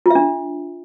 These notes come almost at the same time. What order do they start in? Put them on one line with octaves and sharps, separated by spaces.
F4 E5 D4